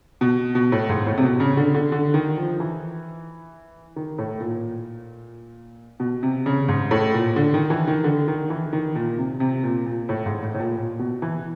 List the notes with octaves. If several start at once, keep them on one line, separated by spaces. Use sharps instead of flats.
B2
B2
A2
G#2
A2
C3
B2
C#3
D3
D3
D3
D#3
F3
E3
D#3
A2
A#2
B2
C3
C#3
G#2
A2
A#2
D3
D#3
E3
D#3
D3
D#3
E3
D#3
A#2
C3
C3
A#2
A#2
A2
G#2
A2
A2
A#2
A#2
B2
E3